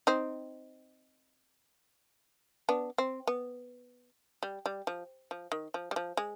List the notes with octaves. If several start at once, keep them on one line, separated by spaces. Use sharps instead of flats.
C4 D#4
B3 D4
C4
B3
G3
G3
F3
F3
D#3
F3
G3
F3
G#3